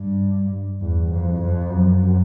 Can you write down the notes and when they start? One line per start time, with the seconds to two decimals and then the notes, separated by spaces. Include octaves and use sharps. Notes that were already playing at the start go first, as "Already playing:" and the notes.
Already playing: G2
0.81 E2
1.12 F2
1.42 F2
1.70 F#2